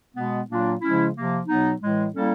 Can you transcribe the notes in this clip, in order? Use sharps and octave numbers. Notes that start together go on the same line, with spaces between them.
B2 G#3 B3
A#2 F#3 A#3 D4 F4
C#3 F3 G#3 C#4 E4
C3 F3 A#3
B2 F#3 B3 D#4
A2 E3 G#3
G3 A#3 C#4 E4 A4